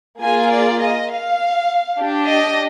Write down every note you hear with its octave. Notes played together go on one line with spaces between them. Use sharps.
A#3 F4 G#4 G#5
D5
D#5
F5
D4 G4
D#5